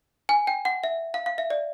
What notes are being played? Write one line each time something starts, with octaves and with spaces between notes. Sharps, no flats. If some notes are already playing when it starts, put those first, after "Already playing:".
G#5
G5
F#5
E5
F5
F5
E5
D5